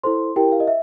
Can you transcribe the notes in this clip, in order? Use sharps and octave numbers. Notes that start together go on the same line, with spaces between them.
E4 A4 C5 C6
E4 G4 A#4 G5
F5
D#5
E5